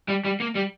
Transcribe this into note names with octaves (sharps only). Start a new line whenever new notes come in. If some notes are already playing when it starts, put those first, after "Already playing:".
G3
G3
A#3
G3